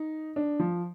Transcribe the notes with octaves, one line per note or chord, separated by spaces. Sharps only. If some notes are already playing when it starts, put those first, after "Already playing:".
Already playing: D#4
D4
F3